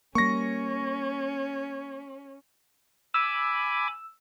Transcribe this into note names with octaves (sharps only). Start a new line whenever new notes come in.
G3 A#3 C#4 C#6 A#6
G#5 B5 D6 E6